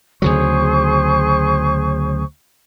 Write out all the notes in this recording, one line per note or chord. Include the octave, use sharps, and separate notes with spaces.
D2 C#3 F#3 G#4 C5 C#6